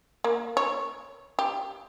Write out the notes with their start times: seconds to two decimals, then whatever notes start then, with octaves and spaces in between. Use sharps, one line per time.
0.24 A#3
0.57 C#5
1.39 G4